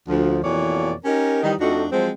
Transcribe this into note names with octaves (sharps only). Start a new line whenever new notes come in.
D2 F3
F2 B2 E3 A#3 C#5 D5
C#4 D#4 G4 A#4
D#3 E3 G3 D#4
F2 A3 D4 D#4 F#4
F3 F#3 G#3 C4